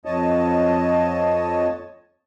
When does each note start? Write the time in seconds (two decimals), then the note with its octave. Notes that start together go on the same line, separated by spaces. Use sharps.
0.05 F2 C#5 D#5 A5